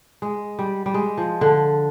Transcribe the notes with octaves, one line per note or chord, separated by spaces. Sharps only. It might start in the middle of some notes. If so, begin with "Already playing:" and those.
G#3
G3
G3
G#3
F3
D3